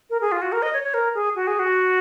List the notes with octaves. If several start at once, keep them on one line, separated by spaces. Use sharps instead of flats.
A#4
G#4
F4
F#4
A#4
D#5
C#5
C#5
A#4
G#4
F#4
G#4
F#4